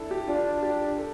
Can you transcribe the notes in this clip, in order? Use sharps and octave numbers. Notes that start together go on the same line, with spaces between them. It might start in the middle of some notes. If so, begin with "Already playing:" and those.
Already playing: D4 E4 A4
G4
D4 F4
G4
A4